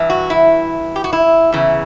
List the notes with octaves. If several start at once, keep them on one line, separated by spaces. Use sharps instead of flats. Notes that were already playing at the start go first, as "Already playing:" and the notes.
Already playing: G2 E3
F#4
E4
G4
F#4
E4
E2 C#3 E3